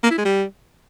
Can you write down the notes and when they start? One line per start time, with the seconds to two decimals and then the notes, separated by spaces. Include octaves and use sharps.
0.03 A#3
0.11 E4
0.18 G#3
0.25 G3